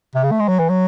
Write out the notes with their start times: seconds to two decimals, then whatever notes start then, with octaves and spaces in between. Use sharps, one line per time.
0.15 C3
0.24 C#3
0.31 A3
0.40 G#3
0.48 F#3
0.59 E3
0.70 F#3